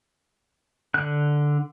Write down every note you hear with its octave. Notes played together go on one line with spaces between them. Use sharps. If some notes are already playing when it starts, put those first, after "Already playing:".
D3 F#6